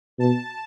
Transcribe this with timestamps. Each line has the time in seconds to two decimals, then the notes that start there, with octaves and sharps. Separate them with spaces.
0.19 B2 A5